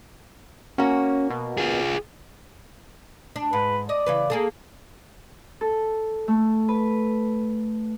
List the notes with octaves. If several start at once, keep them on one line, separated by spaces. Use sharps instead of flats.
A#3 C#4 F#4
B2
F4 G#4
D4
G#2 B4
D5 D#5
C#3 E3 B4
A#3 G#4 A4
A4
A3
B4